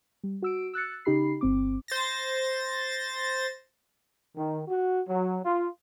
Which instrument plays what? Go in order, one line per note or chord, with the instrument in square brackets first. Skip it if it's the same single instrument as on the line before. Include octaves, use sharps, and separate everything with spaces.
[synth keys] G3
F#4 E6 D7
E6 F#6 A6 C#7
C#3 D#4 G4 B5 C7
G1 C4 D6
[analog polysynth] C5 A6 A#6
[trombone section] D#3
F#4
F#3
F4